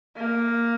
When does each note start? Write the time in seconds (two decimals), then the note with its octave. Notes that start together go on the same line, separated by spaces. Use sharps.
0.17 A#3